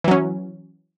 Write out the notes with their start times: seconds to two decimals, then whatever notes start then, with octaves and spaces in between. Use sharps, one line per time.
0.04 E3
0.08 F#3
0.11 C#4